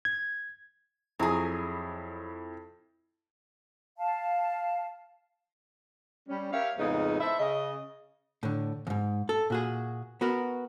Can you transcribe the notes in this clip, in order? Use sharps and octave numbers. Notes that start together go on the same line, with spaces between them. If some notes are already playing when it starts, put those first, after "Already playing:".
G#6
F2 F#3 E4 G#4
F5 A5
G3 C#4
G4 A#4 C#5 E5 F5
F2 A2 C#3 G#3 B3 D#4
E4 A4 C5 E5
C#3 D#5
A2 D3
D#2 G#2
A4
A#2 F#4 G#4
B3 F#4 A#4